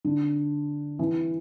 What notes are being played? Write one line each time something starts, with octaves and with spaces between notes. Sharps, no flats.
D3
E3